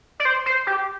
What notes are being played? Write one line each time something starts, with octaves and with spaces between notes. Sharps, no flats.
D5
C5
C5
G4